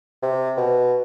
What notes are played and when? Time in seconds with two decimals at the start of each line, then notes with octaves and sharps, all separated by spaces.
0.22 C3
0.57 B2